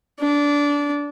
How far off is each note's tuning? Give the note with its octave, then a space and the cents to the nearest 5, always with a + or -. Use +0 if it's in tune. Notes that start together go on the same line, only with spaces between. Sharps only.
D4 -20